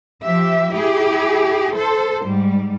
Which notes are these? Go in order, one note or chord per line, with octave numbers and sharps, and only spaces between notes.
F3 G4 E5
E4 G4 G#4
A4 C5
G#2 G3